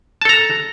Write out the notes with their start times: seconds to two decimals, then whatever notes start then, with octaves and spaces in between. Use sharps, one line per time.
0.21 A5
0.25 A4
0.29 A#5